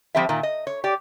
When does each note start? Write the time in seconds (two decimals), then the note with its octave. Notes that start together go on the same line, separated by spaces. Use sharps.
0.15 F3 G3 C4 G4 E5
0.29 A#2 D#3
0.43 D#5
0.67 C#5
0.84 G4 D5